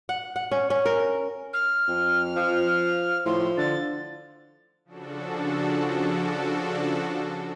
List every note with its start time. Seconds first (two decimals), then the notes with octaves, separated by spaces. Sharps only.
0.09 F#5
0.36 F#5
0.51 C#4
0.70 C#4
0.86 A#4
1.53 F6
1.88 F2
2.36 F3
3.26 A2 F3 C6
3.57 D3 A6
4.85 C#3 F3 D4 F#4 A4